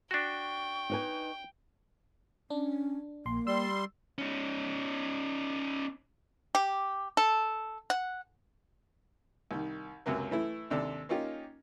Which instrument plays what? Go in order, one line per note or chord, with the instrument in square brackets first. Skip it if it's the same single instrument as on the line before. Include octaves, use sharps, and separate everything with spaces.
[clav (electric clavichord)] D4 F#4 [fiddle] G5 [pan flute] C#6
[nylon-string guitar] D#4 B4 G#5
[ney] C#4 [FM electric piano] D4
[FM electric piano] A#1 C6 [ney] A#3
[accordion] G3 C6 [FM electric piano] E6
[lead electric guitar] C#4 D#4
[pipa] G4
A4
F#5
[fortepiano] C2 D#3
C#2 F#2 C3 F#3 A#3
E3 A3 E4
D#2 G#2 C3 D4 A4
A#3 C#4 D#4 F4 G4